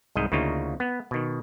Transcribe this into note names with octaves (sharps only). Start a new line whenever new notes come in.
C2 G#2 D#5
D2 C#3 A#3 D#4 F4
B3
B2 D#3